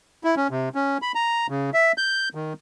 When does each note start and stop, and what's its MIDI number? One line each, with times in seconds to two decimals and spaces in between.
0.24 0.35 64
0.36 0.47 61
0.51 0.69 48
0.75 0.98 61
1.02 1.12 83
1.15 1.47 82
1.50 1.70 49
1.74 1.92 76
1.98 2.29 91
2.35 2.53 51